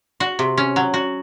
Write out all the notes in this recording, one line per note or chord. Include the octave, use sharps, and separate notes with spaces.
F#4
C3
C#4
F#3
F#4